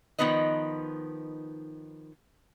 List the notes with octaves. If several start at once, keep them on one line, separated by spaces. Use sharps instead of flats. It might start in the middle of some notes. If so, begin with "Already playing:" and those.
D#3 F3 B3 D#4 B4 D#5